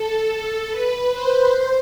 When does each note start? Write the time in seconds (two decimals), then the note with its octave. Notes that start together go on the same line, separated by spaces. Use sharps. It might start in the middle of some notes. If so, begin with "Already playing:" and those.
Already playing: A4
0.29 A4
0.70 B4
1.10 C5
1.49 C5